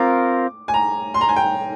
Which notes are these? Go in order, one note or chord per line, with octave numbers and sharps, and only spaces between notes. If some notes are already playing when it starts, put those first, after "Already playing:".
Already playing: C4 F4 A#4 D6
G#5
A#5
C6
A#5
G#5
G5